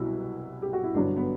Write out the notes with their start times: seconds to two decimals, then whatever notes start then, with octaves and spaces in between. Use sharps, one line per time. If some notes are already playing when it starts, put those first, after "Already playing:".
Already playing: C2 B2 F#3 E4 F#4
0.62 G4
0.73 F#4
0.84 E4
0.94 G1 G2 F#3 D4
1.17 B3